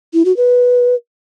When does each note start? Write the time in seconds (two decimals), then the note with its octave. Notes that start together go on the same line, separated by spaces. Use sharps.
0.14 E4
0.25 F#4
0.37 B4